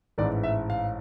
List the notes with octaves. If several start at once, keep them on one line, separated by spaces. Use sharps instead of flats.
A1 G#2 E3 D5
E5
F5